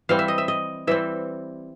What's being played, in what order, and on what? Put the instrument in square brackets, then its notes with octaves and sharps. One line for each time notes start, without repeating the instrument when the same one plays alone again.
[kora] E3 G3 C4 F5
E5
D#5
E5
D#5
E3 G3 C4 E5